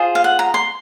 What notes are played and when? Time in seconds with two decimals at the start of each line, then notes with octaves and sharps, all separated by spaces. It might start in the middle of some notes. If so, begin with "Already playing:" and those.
Already playing: F4 G#4 C5
0.15 F5
0.24 F#5
0.39 A#5
0.54 C6